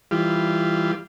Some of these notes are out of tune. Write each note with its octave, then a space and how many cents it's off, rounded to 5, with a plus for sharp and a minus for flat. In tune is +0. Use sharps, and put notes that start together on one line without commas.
E3 +0 G3 +10 F4 -15